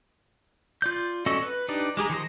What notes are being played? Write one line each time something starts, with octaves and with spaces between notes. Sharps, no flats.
F4 D5 G6
C#4 F#4 A4 D5 D#5
B4
D4 D#4 G4 B4 D5
G#3 G4 G#4 A#5
D#3 F3 C5 D#5